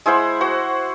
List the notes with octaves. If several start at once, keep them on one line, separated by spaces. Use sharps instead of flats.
G#3 E4 C5 F#5
F#4 C5 F#5